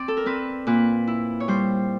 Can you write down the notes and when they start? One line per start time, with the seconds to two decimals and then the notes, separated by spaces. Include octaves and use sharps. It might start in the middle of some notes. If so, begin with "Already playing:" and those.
Already playing: C4 D5
0.08 A4
0.17 A#4
0.26 C4 B4
0.67 A#2 B4
1.07 E4
1.40 C#5
1.48 G3 C5